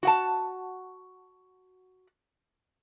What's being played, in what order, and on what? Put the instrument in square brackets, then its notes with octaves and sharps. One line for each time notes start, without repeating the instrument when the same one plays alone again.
[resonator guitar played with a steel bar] F#4 F#5 A5